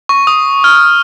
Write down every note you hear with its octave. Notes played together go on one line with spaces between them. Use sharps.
C#6
D#6
F6